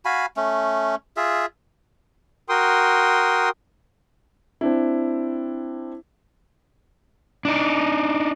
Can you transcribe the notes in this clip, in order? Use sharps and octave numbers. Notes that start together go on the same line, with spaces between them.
F#4 F5 G#5 B5
A3 C#4
F4 G#4 E5
F#4 A#4 G5 C6 D#6
C4 D4 E4
D4 D#4